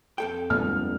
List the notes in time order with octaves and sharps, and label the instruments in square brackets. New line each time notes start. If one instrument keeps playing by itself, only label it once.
[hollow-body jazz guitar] F2 A4 G5
[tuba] G1 [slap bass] A#2 F3 G#3 [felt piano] F6